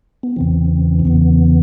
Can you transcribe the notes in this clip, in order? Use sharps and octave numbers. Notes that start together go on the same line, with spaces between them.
B3
E2 C#3 E3 C4
C4
E2 C#3 E3 B3